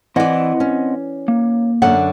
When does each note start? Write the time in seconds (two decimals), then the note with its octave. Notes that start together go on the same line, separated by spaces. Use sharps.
0.16 E3 C4 D5 D#5 F#5
0.60 C#4
1.28 A#3
1.82 F#2 D3 F#5